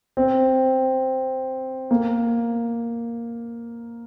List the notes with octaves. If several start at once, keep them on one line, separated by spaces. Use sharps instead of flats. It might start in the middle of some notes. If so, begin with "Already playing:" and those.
C4
A#3